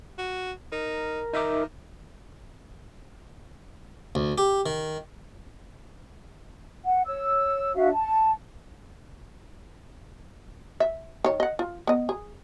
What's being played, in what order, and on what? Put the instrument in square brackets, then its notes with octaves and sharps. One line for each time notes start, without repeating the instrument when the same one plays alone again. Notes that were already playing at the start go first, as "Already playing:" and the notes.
[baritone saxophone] F#4
[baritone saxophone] D#4 [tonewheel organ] A#4
[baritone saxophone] D#3 [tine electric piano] D#4 E5 D6
[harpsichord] D2
G4
D#3
[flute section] F#5
C#5 E6
D4 F#4 E5 F5
A5
[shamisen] E5
D#3 C#5
D#5 F#5
F4
B3 D#5
G#4